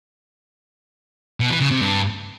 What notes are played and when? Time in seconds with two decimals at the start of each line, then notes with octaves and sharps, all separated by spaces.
1.40 B2
1.50 E3
1.61 C#3
1.71 C3
1.81 G2